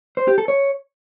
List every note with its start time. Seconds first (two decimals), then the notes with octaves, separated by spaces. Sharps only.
0.17 C5
0.27 G4
0.38 A4
0.48 C#5